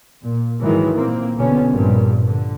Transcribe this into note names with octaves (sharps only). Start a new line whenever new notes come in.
A#2
G#2 D#3 E3 F#3 G#3
A#2 A#3 C4
F#1 B2 D3 B3 C#4
A#1 G2 A#2
D3